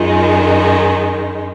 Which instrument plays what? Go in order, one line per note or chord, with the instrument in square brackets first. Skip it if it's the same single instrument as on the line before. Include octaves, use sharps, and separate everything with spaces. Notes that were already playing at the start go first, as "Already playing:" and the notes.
Already playing: [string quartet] F#2 D#3 G#3 D#4 [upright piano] F4